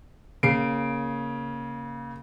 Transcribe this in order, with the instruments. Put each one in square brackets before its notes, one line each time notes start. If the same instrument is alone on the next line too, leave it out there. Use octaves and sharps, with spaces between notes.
[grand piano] C#3 C7 D7 [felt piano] A#3